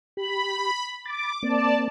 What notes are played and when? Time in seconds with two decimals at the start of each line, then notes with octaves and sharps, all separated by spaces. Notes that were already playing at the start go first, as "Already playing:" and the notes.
0.17 G4 B5
1.06 B5 D6 A6
1.43 A#3 C4 D5 A5